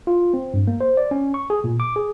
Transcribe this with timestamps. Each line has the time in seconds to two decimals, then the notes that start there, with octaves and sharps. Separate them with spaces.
0.07 F4
0.34 C4
0.54 G2
0.67 A#3
0.81 C5
0.97 D5
1.11 C#4
1.34 C#6
1.50 G#4
1.64 A#2
1.80 D6
1.96 G#4